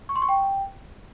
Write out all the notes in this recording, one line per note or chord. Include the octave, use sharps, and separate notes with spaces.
C#6
C6
C#6
G5